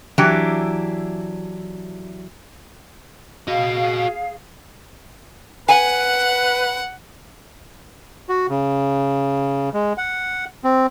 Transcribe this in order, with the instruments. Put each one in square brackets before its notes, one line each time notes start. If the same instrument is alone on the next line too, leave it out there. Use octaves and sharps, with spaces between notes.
[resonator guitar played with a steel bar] E3 F#3 D4 E4 G4
[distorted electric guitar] F#4 D#5 [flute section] G#4 F5
[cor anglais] B4 [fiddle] F#5 [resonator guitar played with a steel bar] G#5
[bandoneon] F#4
C#3
G#3
F#5
C4